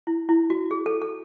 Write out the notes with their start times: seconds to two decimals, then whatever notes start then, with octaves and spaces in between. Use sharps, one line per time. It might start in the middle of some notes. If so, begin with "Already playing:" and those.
0.07 E4
0.29 E4
0.50 F#4
0.71 G#4
0.86 A4
1.02 A4